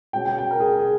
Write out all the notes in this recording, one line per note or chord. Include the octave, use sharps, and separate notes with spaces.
B2 G#3 C#4 G5
G5
G5
A#4
G#4
G#4